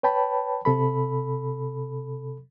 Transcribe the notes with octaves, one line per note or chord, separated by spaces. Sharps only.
B4 C#5 G5 A5 B5
C3 A4 B5